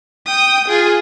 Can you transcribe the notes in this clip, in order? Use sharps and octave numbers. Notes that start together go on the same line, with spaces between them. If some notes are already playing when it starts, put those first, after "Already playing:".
G5 D#6
F4 G#4